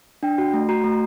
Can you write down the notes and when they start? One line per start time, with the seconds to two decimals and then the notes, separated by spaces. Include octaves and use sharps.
0.23 D4 G5
0.38 F#4
0.54 A3
0.69 F#4 A#5
0.84 A3